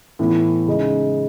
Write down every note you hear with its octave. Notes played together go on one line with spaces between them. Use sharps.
A2 E3 B3
C#3 G#3 D#4 G#4